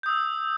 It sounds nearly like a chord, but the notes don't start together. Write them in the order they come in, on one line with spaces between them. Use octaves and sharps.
G6 D#6 E6